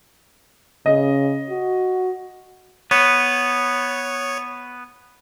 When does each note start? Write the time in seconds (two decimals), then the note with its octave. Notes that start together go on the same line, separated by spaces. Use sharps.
0.86 C#3 D#5
1.50 F#4
2.91 B3 C#5